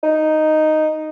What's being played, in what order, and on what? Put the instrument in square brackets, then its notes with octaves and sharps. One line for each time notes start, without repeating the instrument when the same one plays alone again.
[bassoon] D#4